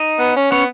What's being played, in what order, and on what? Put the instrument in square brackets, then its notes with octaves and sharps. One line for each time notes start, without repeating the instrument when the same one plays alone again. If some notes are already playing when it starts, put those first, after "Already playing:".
Already playing: [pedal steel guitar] D#4 D#5
[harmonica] B3
C#4
[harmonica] B3 [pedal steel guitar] C#4 C#5